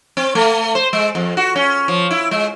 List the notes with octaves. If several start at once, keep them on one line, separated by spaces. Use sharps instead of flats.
C4
A3
C5
G#3
F2
F#4
C#4
F3
E4
G#3